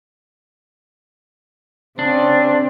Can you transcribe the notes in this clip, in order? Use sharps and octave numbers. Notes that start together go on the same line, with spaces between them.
C#3 C4 D4